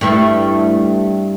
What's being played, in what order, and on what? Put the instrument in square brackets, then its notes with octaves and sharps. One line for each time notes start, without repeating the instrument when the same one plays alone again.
[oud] G2 A3 E4